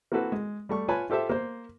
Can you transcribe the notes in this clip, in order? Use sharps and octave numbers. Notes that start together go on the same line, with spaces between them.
A#3 C4 E4 F#4 A4 B4
G#3
G3 A3 C#6
F4 B4 C#5 G#5 A5 B5
F4 G4 A4 C5 E5
A#3 C5